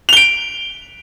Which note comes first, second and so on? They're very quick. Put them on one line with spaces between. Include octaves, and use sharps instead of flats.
F7 G7 D7